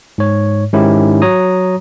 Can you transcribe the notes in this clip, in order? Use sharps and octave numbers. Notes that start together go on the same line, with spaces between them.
G#2 C#5
G#2 D#3 C#4 D#4 E4 G4
F#3 C#5 A#5 D#6